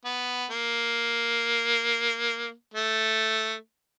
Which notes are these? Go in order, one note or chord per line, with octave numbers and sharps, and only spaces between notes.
B3
A#3
A3